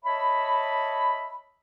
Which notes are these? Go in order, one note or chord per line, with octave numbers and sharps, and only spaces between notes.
C#5 D#5 E5 A5 B5